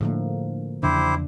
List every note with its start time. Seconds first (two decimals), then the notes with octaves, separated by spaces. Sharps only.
0.01 A2 D3 F3 A#3
0.83 E2 C#3 F3 D4 E4 G4 C5